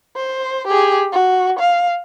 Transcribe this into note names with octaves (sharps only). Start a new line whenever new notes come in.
C5
G4 G#4
F#4
F5